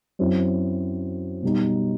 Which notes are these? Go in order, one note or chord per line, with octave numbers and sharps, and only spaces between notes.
F#2 F#3 C4 E4
B2 G3 D#4